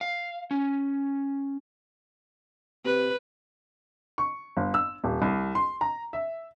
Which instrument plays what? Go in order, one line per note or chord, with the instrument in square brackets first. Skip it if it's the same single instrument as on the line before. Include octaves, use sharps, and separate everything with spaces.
[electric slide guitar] F5
C#4
[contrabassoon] C3 [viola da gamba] B4
[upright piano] C#6
G1
E6
D#1
C2
C6
A#5
E5